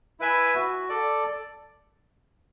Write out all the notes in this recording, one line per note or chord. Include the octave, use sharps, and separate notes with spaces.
E4 B4 E5 G#5
F#4
A4 D5